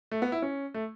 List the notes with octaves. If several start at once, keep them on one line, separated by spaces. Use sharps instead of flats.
A3
B3
E4
C#4
A3